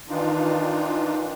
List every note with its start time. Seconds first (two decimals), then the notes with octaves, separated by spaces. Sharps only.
0.09 D#3 E3 D4 D#4 F4